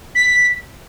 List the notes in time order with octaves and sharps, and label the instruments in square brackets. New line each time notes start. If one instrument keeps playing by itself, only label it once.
[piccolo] B6